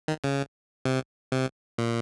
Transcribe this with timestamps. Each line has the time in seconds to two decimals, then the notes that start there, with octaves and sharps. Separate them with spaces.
0.08 D#3
0.24 C#3
0.85 C3
1.32 C3
1.78 A#2